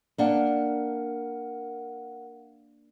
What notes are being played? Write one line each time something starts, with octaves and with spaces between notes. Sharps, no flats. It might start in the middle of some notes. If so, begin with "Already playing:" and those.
A#3 D4 A#4 F5 F#5